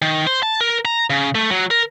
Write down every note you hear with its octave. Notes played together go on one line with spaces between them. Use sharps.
D#3
C5
A5
A#4
A#5
C#3
A3
F#3
A#4